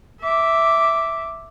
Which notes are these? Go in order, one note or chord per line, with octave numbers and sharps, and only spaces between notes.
E5 D6